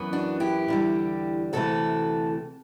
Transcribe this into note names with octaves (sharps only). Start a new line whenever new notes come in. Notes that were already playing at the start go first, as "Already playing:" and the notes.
Already playing: F#2 E3 B3
D4 F#4
E4 G4
E2 D3 G3
D2 C3 E3 A3 F#4 A4